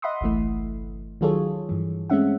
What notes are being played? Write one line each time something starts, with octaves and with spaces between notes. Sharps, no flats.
D#5 E5 F#5 B5 C6 D#6
G1 C2 E3 A3
D#3 F#3 F4 G#4 A4 C#5
G2 E3
G#3 A3 C4 C#4 E5 F#5